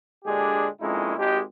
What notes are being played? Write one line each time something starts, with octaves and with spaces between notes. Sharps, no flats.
A#2 D3 G#3 D4 G4 G#4
F2 A#2 G#3 C#4 D#4 E4
G#1 G#3 G4